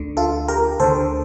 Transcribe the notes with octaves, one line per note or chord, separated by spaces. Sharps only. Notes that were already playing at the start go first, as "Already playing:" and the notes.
Already playing: D2 D3
F4 A4
G4 A#4
D2 D3 A4 C5